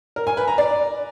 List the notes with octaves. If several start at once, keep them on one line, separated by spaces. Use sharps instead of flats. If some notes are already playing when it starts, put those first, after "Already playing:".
A#4
G#5
B4
A#5
D5